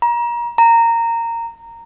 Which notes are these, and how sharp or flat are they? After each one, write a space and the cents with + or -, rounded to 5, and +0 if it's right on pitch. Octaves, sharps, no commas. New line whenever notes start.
A#5 +30
A#5 -15